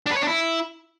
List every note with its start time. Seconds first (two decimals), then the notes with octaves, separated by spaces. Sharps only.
0.06 D4
0.11 B4
0.17 C#5
0.22 D4
0.27 E4